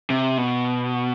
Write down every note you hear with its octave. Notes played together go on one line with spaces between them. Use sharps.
C3
B2